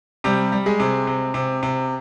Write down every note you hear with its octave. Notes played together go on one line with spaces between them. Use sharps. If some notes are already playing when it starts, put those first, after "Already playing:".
C3 G3 G4
G3
G#3 G#4
C3
C3
C3
C3